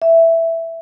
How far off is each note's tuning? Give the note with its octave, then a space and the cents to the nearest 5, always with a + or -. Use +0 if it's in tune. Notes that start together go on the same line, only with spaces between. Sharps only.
E5 +5